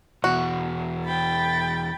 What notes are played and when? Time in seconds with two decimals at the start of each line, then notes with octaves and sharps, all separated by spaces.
0.24 E2 B2 F#4
1.05 G5 B5 A6